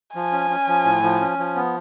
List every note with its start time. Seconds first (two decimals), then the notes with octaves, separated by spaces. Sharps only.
0.15 F3 G#5
0.32 C#4
0.50 C#4
0.67 F3
0.85 A2
1.03 F3
1.21 C#4
1.38 F3
1.55 B3